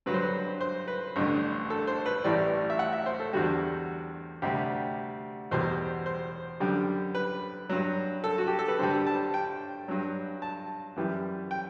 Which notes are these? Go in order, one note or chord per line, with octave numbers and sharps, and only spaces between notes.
G2 D3 F#3 B4
C5
B4
C5
B4
A1 G2 D3
A4
C5
B4
A1 A2 E3 G3 D5
E5
F#5
E5
C5
A4
E2 D3 G3 F#4
D2 C3 G3 G4
E2 B2 G3 C5
C5
F#2 D3 G3
B4
G2 F#3
A4
F#4
G4
A4
B4
G2 D3 G3 C5
A5
G5
G2 F#3
A5
F#2 E3 G3
G5